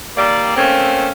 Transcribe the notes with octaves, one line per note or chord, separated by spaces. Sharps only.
D#3 G3 A#3 D5
A3 A#3 C4 C#4